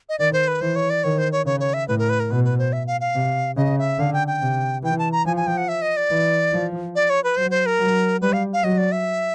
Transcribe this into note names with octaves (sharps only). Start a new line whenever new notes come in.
D#5
D#3 D5
C5
B4
E3 C5
C#5
D5
D#3 C#5
C5
C#5
C#3 C#5
C#5
E5
A2 B4
A#4
B4
A#4
B2 B4
B4
C5
E5
F5
F5
C3
C#3 D#5
E5
D3 F5
G5
G5
C3
E3 G5
A5
A#5
F3 G#5
G#5
G5
F#5
E5
D#5
D5
E3
F3
D5
C#5
B4
F#3 C5
C5
A#4
F#3
G3 B4
F5
F5
F#3 D#5
D5
E5